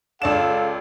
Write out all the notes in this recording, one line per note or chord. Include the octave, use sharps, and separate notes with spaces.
C#2 A4 D5 F5 E7